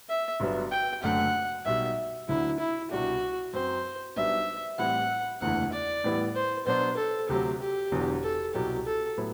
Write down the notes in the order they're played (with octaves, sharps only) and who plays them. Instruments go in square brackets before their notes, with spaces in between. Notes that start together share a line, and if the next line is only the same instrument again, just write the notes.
[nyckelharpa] E5
[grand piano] G1 G2 F#3 B3
[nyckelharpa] G5
[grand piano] F#1 F#2 D3 A3 [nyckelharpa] F#5
[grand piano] B1 B2 G3 [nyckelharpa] E5
[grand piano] D2 D3 F#3 [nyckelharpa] E4
[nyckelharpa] E4
[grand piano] C2 B2 G3 D4 G4 [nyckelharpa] F#4
[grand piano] F#2 F#3 C4 [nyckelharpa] C5
[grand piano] B1 B2 G3 B3 D4 [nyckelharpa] E5
[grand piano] A2 E3 G3 C4 E4 [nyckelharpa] F#5
[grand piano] F#1 E2 D3 A3 E4 [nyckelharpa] F#5
[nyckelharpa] D5
[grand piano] A2 E3 G3 B3 E4
[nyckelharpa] C5
[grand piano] B2 F#3 B3 D4 [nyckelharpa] C5
[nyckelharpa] A4
[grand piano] D2 C3 F#3 [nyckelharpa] G4
[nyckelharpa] G4
[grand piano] E1 E2 D3 F#3
[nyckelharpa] A4
[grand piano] C2 B2 F#3 [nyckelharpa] G4
[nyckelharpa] A4
[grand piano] A2 F#3 B3 E4